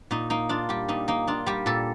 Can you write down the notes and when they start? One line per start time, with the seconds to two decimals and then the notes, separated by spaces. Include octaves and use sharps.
0.11 A#2 D#4
0.30 A#3 D#4
0.49 D4 F4
0.69 G3 G4
0.88 A#2 D#4
1.08 A#3 D#4
1.27 D4 F4
1.46 G3 G4
1.66 A#2 A4